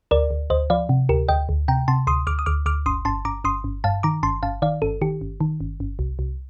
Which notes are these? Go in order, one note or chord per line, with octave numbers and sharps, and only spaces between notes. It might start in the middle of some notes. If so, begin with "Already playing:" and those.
D2 A#4 D5
D2
D2 C5 D#5
F3 D5 F5
C3
D2 G4 A#4
D2 D#5 G5
D2
C3 G5 A#5
C3 A5 C6
D2 C6 D#6
D2 D6 F6
D#6
D2 D6 F6
D2 D6 F6
G1 C6 D#6
G1 A5 C6
G1 A#5 D6
G1 C6 D#6
G1
G2 F5 A5
D#3 A#5 D6
G1 A5 C6
G1 F5 A5
D#3 D5 F5
G1 A4
D#3 G4
G1
D#3
G1
G1
C2
C2